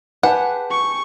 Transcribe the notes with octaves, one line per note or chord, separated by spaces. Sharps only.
G4 G#4 B4 F#5 A5
C#6